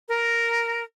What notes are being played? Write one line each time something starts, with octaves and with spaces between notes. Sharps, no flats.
A#4